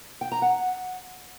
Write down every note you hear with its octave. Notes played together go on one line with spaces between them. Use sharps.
G5
A#5
F#5